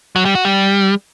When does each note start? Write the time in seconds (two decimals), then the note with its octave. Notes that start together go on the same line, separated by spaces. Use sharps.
0.16 F#3
0.25 G3
0.35 F#4
0.45 G3